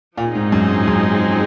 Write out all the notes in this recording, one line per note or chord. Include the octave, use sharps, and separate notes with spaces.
A#2 F3 C4 D#4 G#4
G#2
F#2
G#2
F#2